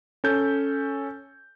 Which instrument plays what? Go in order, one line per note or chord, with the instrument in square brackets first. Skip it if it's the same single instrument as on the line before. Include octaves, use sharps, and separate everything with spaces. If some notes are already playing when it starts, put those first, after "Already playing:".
[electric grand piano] C#4 A4 G6